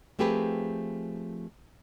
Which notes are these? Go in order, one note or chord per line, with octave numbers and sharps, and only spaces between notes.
F3 A3 C4 G4 G#4 B4